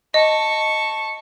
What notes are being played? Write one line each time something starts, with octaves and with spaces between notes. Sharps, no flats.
D#5 A5 C#6